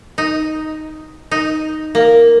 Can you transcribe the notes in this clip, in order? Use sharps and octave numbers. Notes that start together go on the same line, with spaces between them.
D#4
D#4
A#3